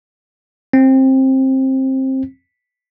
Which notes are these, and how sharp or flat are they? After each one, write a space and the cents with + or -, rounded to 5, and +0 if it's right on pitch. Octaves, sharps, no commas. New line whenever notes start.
C4 +20